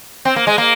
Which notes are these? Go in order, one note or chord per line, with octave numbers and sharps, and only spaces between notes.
C4
A#3
G#3
A#3